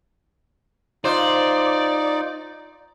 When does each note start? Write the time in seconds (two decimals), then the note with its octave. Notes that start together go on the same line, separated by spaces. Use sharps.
1.04 D#4 F4 C5 D5